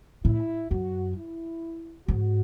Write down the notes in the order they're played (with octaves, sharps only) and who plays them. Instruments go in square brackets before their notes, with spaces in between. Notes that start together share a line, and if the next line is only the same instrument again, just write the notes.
[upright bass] A2 [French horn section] E4
[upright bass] F#2 [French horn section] F#4
[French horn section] E4
[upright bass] G#2 [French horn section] F#4